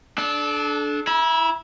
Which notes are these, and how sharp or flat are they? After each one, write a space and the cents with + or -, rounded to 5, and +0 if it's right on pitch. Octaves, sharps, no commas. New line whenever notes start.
D4 +0 A4 -30
E4 +0 B5 -45